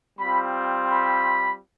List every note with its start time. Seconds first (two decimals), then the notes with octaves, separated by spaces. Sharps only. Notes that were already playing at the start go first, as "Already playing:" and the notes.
0.19 G3 C4 F4 B5
0.90 B5